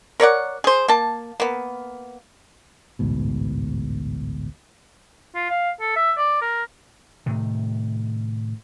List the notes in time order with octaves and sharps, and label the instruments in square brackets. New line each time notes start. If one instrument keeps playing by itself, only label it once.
[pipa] A#4 C#5 D5 F#5
G#4 C5
A#3 A5
A#3 B3
[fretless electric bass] A1 D2 G#2 B2
[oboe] F4
F5
A4
E5
D5
A#4
[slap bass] A2 C3 D#3